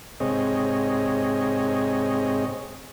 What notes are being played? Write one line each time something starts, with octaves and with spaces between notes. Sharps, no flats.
G#2 C3 C4 G#4 C#5 D#5